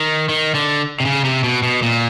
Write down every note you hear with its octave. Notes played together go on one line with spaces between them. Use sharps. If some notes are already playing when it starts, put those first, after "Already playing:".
Already playing: D#3
D#3
D3
C3
C#3
C3
B2
B2
A#2